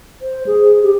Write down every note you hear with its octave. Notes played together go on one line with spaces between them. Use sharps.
C5
G#4
G4